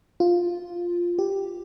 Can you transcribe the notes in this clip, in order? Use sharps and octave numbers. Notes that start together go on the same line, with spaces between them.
F4
G4